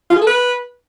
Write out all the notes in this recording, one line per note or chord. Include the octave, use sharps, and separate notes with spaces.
F4
G#4
A4
B4